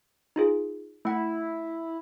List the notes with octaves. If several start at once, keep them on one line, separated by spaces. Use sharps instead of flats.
D#4 F4 G#4
A3 E4 F#5